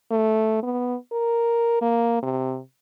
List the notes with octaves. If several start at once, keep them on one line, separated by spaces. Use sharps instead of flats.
A3
B3
A#4
A#3
C3